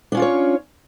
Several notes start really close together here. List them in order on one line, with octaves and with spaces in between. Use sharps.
D4 C#4 F4 D5 C#5